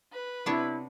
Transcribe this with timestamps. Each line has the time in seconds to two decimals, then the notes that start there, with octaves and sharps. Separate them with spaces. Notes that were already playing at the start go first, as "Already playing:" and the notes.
0.11 B4
0.46 C3 B3 D4 E4 C#5